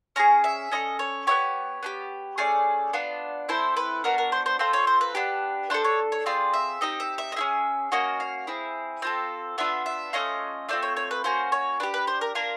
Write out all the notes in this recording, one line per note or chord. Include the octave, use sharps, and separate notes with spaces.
C#4 E4 G#4 A#5
E5
C#4 E4 A4 D#5
C#5
B3 E4 G4 C#5
B3 D4 G4
A3 C#4 G#4 D5
B3 D4 F4
C4 E4 A4 C5
B4
B3 D4 F#4 A#4
A#4
C5
C5
C4 F4 A4 C5
C#5
C5
B4
B3 D4 G4
D4 F4 A4 C5
C#5
C#5
C4 F4 G#4 D5
E5
C4 D#4 G4 D#5
E5
E5
D#5
C#4 E4 G#4 E5
A#3 C#4 F#4 D#5
F5
C4 E4 G#4
C4 F4 A4
B3 D4 F4 E5
E5
A3 C#4 F4 D#5
A3 C4 F4 D5
C#5
C#5
B4
A#3 C#4 F#4 C5
C#5
D4 G4 B4
B4
C5
A#4
A#3 D4 F4 A#4